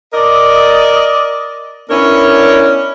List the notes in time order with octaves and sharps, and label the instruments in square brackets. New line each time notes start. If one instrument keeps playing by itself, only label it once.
[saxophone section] A#4 D5 D#5
B3 C#4 D4 E4 A#4 C#5